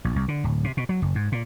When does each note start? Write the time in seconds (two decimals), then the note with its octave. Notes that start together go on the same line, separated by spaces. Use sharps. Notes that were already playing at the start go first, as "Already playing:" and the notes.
0.05 A#1
0.16 C2
0.28 D3
0.44 D1
0.64 C3
0.77 B2
0.89 F#3
1.02 F#1
1.15 G#2
1.32 A#2